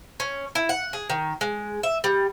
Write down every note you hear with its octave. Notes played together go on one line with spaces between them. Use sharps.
C#4
E4
F#5
G#4
D#3
G#3
E5
G3